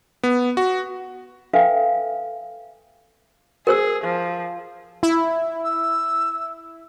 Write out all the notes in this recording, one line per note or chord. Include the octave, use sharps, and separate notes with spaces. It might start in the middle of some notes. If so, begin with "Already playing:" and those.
B3
F#4
A4 B4 E5 F5 G5 G#5
G#4 A#4 C5 E6
F3
E4
E6